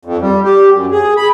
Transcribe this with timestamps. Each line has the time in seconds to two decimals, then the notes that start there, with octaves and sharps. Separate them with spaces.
0.05 F2
0.21 G3
0.44 G4
0.74 F#2
0.91 G#4
1.17 B5